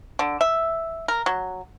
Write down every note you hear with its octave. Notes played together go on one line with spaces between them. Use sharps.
D3
E5
A#4
F#3